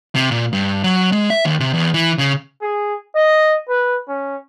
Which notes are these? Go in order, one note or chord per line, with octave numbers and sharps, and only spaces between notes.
C3
A#2
G2
F#3
G#3
E5
D#2
C3
E2
E3
C#3
G#4
D#5
B4
C#4